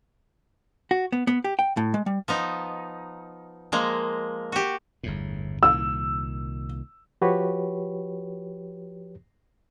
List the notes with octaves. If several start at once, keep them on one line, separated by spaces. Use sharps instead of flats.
F#4
B3
B3
G4
G5
A2
G#3
G3
F3 B3 D#4
F3 G#3 A#3
F#4 G4
G1 E2 A2
C2 A#2 D#3 E6
F3 F#4 G4 B4 C#5